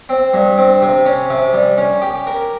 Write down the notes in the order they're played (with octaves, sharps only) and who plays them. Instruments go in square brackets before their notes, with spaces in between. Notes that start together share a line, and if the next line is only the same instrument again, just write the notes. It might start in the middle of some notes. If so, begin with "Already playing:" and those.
[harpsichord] C4
G2
C4
C3
C#4
C3
G3
C#4
G4
A#4